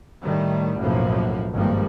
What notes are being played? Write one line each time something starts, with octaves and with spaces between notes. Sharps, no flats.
A2 D#3 G3 A3
B1 F#2 A2 F3 A#3 B3
G#1 G2 F3 G3 A#3